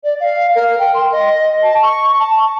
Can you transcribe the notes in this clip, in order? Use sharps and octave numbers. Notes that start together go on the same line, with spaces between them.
D5
F5
A#4
G5
C6
D#5
A5
C#6
A5